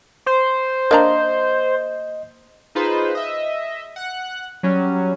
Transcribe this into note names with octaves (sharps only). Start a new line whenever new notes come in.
C5
A#3 D4 D#5 A#5
D#4 F4 G#4 B4 C5
D#5 E5
F#5 F#6
F#3 G3 C#4